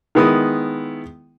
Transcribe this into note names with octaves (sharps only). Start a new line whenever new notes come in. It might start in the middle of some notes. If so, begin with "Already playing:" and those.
D#3 G#3 B3 E4 D#6